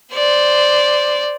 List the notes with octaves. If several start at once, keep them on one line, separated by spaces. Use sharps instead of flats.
C5 D5